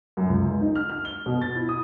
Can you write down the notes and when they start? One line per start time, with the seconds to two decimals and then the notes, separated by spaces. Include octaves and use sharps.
0.17 F#2
0.28 C#2
0.49 G#3
0.61 D#4
0.75 F6
0.89 F6
1.05 G7
1.26 B2
1.41 A6
1.56 E4
1.69 D#6